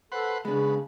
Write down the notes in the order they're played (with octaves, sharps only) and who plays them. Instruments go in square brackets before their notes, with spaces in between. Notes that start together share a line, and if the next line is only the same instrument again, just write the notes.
[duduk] A4 [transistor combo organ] B4 C5 F#5
[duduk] C#3 [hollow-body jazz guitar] G#3 D4 [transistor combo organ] B3